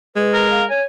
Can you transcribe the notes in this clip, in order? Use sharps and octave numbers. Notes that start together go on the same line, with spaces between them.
G#3 B4
A#4
F5
C#5 G#5